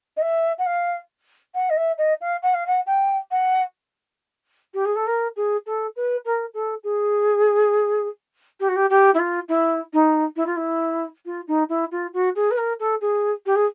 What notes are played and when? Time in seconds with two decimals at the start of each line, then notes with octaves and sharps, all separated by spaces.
0.17 D#5
0.22 E5
0.58 F#5
0.66 F5
1.54 F#5
1.70 D#5
1.77 E5
1.98 D#5
2.21 F5
2.43 F#5
2.54 F5
2.67 F#5
2.86 G5
3.31 F#5
4.74 G4
4.85 G#4
4.96 A4
5.07 A#4
5.36 G#4
5.66 A4
5.96 B4
6.25 A#4
6.54 A4
6.84 G#4
8.60 G4
8.69 F#4
8.76 G4
8.90 G4
9.14 E4
9.19 F4
9.49 E4
9.93 D#4
10.36 E4
10.46 F4
10.56 E4
11.25 F4
11.48 D#4
11.69 E4
11.91 F4
12.14 F#4
12.35 G#4
12.51 B4
12.57 A#4
12.80 A4
13.01 G#4
13.46 G4
13.56 G#4